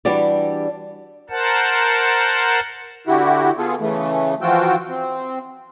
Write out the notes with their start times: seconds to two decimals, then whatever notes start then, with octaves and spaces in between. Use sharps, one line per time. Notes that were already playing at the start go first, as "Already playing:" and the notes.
0.05 E3 G3 D4 F#4 G4 D5
1.30 A#4 C5 F#5 A5
3.07 D3 E4 F#4 G4
3.58 B3 F4 G#4 A4
3.80 C#3 E3 A3
4.42 E3 F3 F4 F#4 G5 E6
4.89 C4